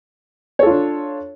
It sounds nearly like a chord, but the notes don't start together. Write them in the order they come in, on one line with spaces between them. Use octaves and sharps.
C#5 A4 F4 D4